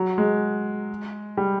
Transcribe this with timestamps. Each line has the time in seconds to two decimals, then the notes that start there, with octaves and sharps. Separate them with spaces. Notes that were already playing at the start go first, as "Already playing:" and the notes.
Already playing: F#3
0.18 G#3
1.37 G3